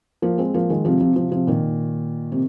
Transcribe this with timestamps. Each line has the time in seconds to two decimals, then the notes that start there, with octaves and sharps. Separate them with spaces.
0.22 F3 A#3
0.38 G#3 C4
0.54 F3 A#3
0.70 D#3 G#3
0.85 C3 F3
1.00 C3 F3
1.16 C3 F3
1.32 C3 F3
1.47 A#2 D#3
2.32 C3